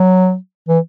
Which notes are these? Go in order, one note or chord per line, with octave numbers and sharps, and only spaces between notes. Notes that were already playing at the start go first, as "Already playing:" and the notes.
Already playing: F#3
E3